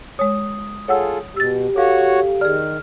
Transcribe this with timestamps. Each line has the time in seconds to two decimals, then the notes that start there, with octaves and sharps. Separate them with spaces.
0.19 G#3 C#5 D#6
0.88 F4 G#4 A4 C#5 F#5 E6
1.37 B2 G4 E6 A6
1.76 F#4 A4 C#5 F5 F#5
2.41 D#3 G#4 D5 F6